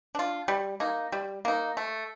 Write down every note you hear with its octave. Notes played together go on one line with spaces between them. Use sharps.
D4 F4
G3
A#3 D#4
G3
A#3 D#4
A3